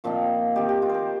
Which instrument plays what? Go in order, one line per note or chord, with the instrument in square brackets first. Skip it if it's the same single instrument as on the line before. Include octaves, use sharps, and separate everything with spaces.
[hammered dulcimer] A#2 F3 C4 D#4 F4
D#3 C4 D#4 G4
G4
F4
A#4 C5